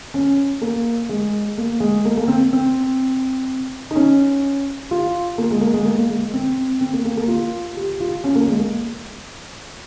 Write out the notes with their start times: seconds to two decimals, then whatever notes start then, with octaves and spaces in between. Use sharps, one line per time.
0.14 C#4
0.62 A#3
1.09 G#3
1.58 A#3
1.80 G#3
2.05 A#3
2.17 A#3
2.28 C4
2.53 C4
3.91 D#4
3.96 C#4
4.91 F4
5.38 A#3
5.51 G#3
5.61 A#3
5.74 G#3
5.85 A#3
5.98 A#3
6.09 G#3
6.34 C4
6.81 C4
6.93 A#3
7.05 A#3
7.17 A#3
7.28 F4
7.77 G4
8.00 F4
8.24 C#4
8.35 A#3
8.48 G#3
8.59 A#3